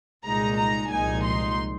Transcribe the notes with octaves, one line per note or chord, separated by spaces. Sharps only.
C2 A#2 G#3 D#4 A#5
A#5
C2 A#2 F3 G#3 D#4 G#5
C6